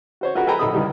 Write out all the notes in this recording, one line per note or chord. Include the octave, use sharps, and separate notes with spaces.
F#4 C5 C#5
F4 F#4 G#4 A#4 B4 F#5
A4 B4 G5 G#5 A#5 B5
A#1 D#4 A4 B5 D#6
C#2 G3 D#4 E4